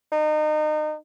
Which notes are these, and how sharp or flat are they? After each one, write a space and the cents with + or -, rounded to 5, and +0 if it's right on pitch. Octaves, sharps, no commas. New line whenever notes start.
D#4 -30